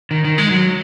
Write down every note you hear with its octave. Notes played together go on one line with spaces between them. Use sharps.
D#3
D#3
G#3
F#3